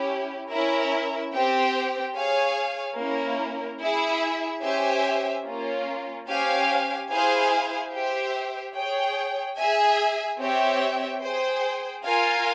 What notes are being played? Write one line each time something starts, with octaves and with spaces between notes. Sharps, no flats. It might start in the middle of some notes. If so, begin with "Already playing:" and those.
Already playing: C#4 E4 G4
C#4 E4 A#4 E5
C4 G4 C5 G5
G#4 C#5 F5 G#5
A#3 C#4 E4 A#4
E4 G#4 E5
C#4 G4 C5 E5 G#5
A#3 C#4 F4
C#4 G4 C5 F5 G#5
E4 G#4 C5 F5 G#5
G4 C5 E5 G5
G#4 C#5 G5
G#4 E5 G#5
C4 G4 C#5 E5 G5
G#4 C5 G5
F4 A#4 F5 G#5